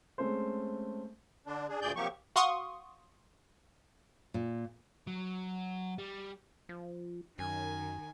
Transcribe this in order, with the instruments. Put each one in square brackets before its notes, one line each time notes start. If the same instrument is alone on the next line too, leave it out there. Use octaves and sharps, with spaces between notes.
[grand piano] G#3 A3 C4 C#4 C5
[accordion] D3 D4
D4 G#4
D2 A#2 G#4 D5 G6
C3 F3 F#3 A#3 G4 C#6
[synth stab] F#4 F5 C6 C#6 D#6
[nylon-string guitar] A#2
[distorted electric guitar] F#3
G3
[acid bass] F3
[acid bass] F#2 [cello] D#3 [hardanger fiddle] G#5